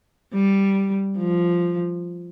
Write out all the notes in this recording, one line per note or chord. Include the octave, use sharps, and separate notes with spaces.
G3
F3